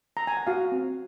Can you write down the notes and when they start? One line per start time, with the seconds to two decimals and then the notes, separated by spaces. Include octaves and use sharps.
0.17 A#5
0.27 G#5
0.37 F#5
0.47 F#4 F5
0.72 C4